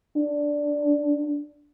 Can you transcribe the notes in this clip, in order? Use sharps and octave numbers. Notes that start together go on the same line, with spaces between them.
D4